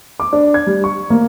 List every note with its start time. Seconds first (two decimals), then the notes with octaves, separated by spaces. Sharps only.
0.20 D6
0.33 D4
0.54 G#6
0.67 G3
0.84 C#6
1.10 A#3